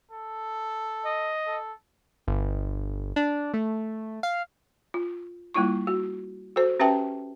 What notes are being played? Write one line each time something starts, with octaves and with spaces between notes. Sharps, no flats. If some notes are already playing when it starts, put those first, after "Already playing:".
A4
D#5
A4
G1
D4
A3
F5
F4
G3 A#3 E4 F4 C#6
F#4
F#4 A4 C5
C#4 G4 B4 E5 G5 A5